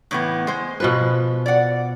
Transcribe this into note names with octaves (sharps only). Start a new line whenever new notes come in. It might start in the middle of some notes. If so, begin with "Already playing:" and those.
A2 E3 B3
G#3 C5
B2 F3 B4
D5 F#5